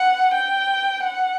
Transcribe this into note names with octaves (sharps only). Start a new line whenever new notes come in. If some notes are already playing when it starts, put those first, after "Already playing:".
Already playing: F#5
G5
F#5